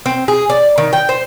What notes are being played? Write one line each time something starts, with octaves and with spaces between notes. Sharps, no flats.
C4
G#4
D5
D#3
G5
C5